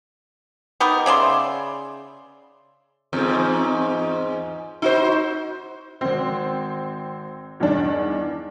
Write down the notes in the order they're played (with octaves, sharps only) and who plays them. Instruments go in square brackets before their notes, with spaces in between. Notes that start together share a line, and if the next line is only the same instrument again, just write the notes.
[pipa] B3 D#4 G4 A#4
C#3 D5 E5 C6
[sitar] E2 G#2
D#4 F#4 C5
[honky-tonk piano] G#1 C4
E2 G2 D#3 D4